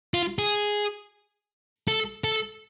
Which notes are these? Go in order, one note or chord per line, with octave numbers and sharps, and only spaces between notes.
F4
G#4
A4
A4